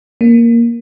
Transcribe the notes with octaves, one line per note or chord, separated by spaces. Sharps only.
A#3